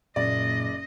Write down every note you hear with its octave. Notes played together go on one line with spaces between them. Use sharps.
F#1 A#2 D5 D#5